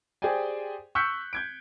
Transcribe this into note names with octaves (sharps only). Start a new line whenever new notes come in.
G4 G#4 C5 D5 G5 G#5
C#6 E6 F#6 G6 B6 C#7
G6 G#6 D7